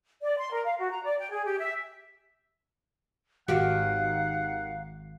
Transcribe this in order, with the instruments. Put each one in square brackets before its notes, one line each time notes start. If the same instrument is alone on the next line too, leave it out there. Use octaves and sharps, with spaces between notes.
[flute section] D5
C6
A#4
F5
F#4
A#5
D5
G5
G#4
G4
E5
[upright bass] G#1 [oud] D#3 F#4 G4 [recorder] F5 [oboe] F#5